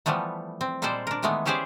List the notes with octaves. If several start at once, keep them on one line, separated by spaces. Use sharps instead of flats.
E3 F3 G3 A3 B3
C4
A#2 G3 G#3 A4 C5 D5
D4 A#4
D#3 E3 G#3 A3 B3
C#4 E4 G4 G#4 C5 D5